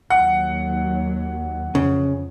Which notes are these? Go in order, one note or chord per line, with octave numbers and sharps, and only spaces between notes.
D#2 F#3 F#5
F2 C#3